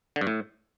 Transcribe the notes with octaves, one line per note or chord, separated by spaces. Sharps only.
D3
G2
A2